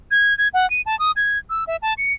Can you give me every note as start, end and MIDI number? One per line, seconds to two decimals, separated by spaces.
0.11 0.36 92
0.38 0.48 92
0.54 0.68 78
0.70 0.81 99
0.86 0.98 81
0.99 1.12 87
1.16 1.38 92
1.50 1.64 88
1.67 1.76 76
1.82 1.94 81
1.98 2.13 97